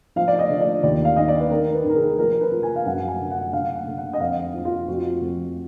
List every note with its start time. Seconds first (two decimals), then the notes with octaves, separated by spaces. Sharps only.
0.16 F3 F5
0.28 D5
0.39 D#5
0.50 D3
0.61 D5
0.83 D#2 D5
1.05 F5
1.16 D#3 D#5
1.28 D5
1.39 B4
1.51 D#3 A#4
1.73 B4
1.85 D#3 A#4
1.96 G#4
2.18 F3 A#4
2.32 A#4
2.41 B4
2.51 F3
2.63 G#5
2.76 F5
2.85 F#2 F#5
3.08 G#5
3.19 D3
3.31 F#5
3.53 D3 F5
3.76 F#5
3.87 D3
3.98 F#5
4.13 D#5
4.20 F2 F5
4.54 F3
4.65 F4
4.88 F2 F#4
5.21 F2